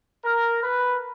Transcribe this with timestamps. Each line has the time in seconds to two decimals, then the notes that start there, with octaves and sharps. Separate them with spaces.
0.23 A#4
0.63 B4